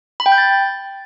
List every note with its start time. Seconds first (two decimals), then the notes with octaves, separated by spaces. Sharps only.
0.20 B5
0.26 G5
0.32 G6
0.38 A6